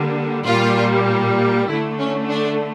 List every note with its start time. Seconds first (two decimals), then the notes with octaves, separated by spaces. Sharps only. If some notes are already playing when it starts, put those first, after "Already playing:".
Already playing: D3 G3 A#3
0.46 A#2 G3 A#3 F4
1.68 D3 A3 E4
1.99 C#4
2.29 D4